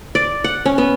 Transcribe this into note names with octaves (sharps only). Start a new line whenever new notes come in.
D5
F#5
C#4
B3